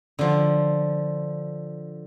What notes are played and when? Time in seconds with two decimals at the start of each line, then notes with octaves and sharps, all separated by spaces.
0.19 D3 F3